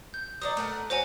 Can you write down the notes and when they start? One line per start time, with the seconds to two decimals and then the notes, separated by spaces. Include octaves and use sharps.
0.14 G6
0.42 F#3 D#4 D5 D#6
0.57 A3 A#4 F#5
0.90 D4 F#4 C5 C#5 G#5